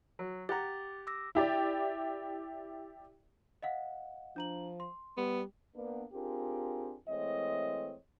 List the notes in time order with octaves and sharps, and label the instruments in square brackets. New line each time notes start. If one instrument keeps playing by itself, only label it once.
[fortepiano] F#3
[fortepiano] G4 F#5 A#5 [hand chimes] D6 A6
[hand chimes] D6 E6 A#6
[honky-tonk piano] E4 G4 D5
[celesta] D#5 F5 F#5
[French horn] F3 [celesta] D4 A#5 F#7
[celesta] C6
[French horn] G3 [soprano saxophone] B3
[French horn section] A#3 B3 D4
C4 D4 F4 G4 G#4 A#4
E3 G#3 A3 C4 C#5 D#5